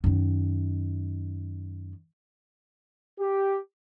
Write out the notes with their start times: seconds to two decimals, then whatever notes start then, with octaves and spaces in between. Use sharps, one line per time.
0.04 F#2 D#3
3.19 G4